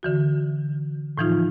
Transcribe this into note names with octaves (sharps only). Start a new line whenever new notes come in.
D3 E3 F#4
A2 E3 F3 D#4 F4